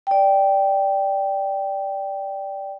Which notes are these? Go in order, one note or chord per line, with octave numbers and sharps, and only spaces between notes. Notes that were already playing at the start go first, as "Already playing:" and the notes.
D5 G5